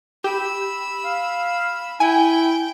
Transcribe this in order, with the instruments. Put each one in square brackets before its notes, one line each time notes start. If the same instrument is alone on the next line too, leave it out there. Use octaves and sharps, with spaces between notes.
[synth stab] G4 [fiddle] B5 E6
[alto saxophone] F5
[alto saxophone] E4 [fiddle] G5 [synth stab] G#5